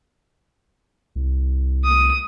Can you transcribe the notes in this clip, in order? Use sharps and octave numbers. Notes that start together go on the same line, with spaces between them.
C2
D#6